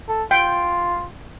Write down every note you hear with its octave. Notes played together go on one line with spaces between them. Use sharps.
A4
F4 G5